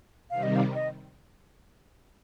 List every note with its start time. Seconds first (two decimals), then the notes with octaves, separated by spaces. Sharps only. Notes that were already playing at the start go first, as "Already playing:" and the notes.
0.30 C3 D#3 G3 F5
0.43 D#5
0.56 F5
0.75 D#5